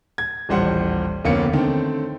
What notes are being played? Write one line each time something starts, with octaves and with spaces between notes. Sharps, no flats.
G#6
D#1 A1 G3 C5 F#5
F1 D2 A#3 B3 C#4 C#7
D3 D#3 A3 C4